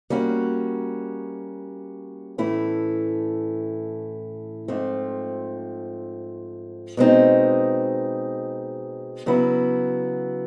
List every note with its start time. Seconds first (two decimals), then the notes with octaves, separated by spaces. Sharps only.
0.10 G3 A#3 C#4 F#4
2.38 A2 E3 A3 C#4 E4
4.68 G#2 F3 A3 C4
6.97 B2 G#3 C4 D#4
9.26 C#3 F#3 B3 E4